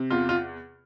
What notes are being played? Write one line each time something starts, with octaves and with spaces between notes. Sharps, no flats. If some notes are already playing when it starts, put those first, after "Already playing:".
Already playing: C3
E2 F4
F4